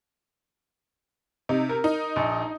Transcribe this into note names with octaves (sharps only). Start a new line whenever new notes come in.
C3 D#4
A#4
D#4
A#1